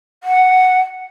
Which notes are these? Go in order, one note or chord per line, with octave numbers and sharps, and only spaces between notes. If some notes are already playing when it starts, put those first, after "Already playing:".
F#5